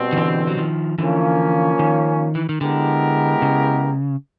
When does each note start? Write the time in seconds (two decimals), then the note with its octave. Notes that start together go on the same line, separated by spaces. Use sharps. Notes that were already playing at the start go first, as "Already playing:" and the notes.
Already playing: B2 G3 C4
0.13 D#3
0.17 D3 E3
0.47 F#3
0.57 D#3 F3
0.98 D3 E3 F3 A#3 C#4
1.79 D#3
2.35 E3
2.49 D#3
2.61 D3 G#3 B3 E4 G4 A#4
3.42 C#3